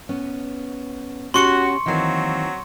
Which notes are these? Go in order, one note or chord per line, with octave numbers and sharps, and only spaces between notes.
B3 C#4
C#4 F#4 G4 C6 C#6 C#7
D#3 E3 F#3 A#3 C4